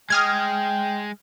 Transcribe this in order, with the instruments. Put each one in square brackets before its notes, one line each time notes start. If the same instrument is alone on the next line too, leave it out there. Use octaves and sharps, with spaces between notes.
[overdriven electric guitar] G#3 [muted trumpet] G5 [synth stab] D#6 F6 G#6